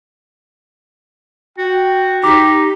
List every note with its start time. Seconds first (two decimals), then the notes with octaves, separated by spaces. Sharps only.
1.58 F#4 G5
2.24 D#4 G4 D6 B6